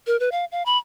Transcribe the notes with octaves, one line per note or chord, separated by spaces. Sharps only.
A#4
B4
F5
F5
B5